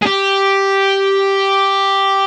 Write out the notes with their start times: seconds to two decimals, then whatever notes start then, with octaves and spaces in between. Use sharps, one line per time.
0.02 G#4
0.06 G4